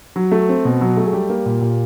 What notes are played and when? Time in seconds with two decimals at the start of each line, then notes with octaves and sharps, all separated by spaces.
0.16 F#3
0.32 A3
0.49 C4
0.65 B2
0.81 F#3
0.97 A3
1.05 G#4
1.12 G3 G4
1.29 A#3
1.46 A#2
1.61 A#2